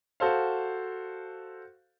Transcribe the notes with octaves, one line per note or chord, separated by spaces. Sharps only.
F#4 A4 C5 F5